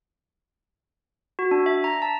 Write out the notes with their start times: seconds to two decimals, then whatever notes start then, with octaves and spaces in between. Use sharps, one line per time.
1.39 F#4
1.51 D4
1.66 E5
1.84 A#5
2.02 A5